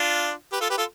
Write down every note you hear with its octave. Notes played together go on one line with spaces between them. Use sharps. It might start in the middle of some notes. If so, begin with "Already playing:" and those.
Already playing: D4 F4
G4 B4
F4 A4
G4 B4
F4 A4